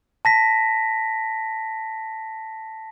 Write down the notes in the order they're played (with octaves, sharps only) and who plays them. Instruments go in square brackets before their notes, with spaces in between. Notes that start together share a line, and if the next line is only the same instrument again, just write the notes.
[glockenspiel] A5 A#6 B6